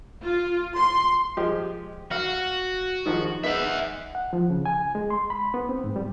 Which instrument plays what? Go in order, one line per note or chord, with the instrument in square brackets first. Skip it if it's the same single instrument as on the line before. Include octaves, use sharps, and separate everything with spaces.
[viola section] F4
C6
[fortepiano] F3 G#3 G4
[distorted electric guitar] F#4 [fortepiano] F5
[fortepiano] D#3 F3 G#3
[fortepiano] G#3 B3 D#4 [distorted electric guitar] E5 F#5
[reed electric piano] F#5
F3
C#3
G#5
G#3
C6
B5
B3
C4
G#2
G3